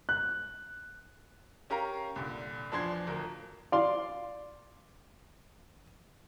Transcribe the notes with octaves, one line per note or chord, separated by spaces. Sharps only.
F#6
C#4 G4 A#4 F5 A#5
C2 A#2 D3
E2 F3 D4 C6 G#6 C7
D1 A#4
D5 F5 C6